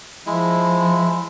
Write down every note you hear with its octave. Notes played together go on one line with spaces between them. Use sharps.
F3 G#3 E4